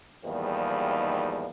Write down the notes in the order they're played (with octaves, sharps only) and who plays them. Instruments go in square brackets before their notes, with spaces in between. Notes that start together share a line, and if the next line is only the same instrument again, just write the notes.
[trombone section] E2 G#2 D#3 F3 G3 A#3